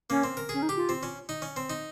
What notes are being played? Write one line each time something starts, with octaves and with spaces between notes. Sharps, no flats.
A#3 C#4
C4
A#4
C#4 G#4
D#4
G4
F4
C4
C#4
D#4
C#4
C4
D#4